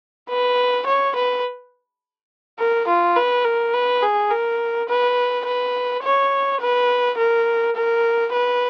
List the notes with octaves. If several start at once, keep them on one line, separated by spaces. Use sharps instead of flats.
B4
C#5
B4
A#4
F4
B4
A#4
B4
G#4
A#4
B4
B4
C#5
B4
A#4
A#4
B4